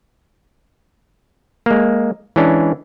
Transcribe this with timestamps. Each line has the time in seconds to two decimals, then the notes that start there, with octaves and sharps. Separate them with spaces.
1.66 G#3 A#3
2.36 E3 G#3 C#4 D4